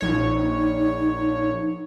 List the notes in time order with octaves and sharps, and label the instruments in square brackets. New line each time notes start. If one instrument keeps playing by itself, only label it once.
[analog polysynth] A#1 C#5 [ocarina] D#4